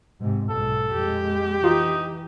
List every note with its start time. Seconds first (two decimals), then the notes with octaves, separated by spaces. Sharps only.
0.20 G#2 C3
0.50 B1 G#2 B2 A4
0.92 F2 A#2 G#3 G4
1.64 E3 D#4 F4 F#4